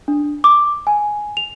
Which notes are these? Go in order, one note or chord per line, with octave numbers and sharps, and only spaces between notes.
D4
D6
G#5
F7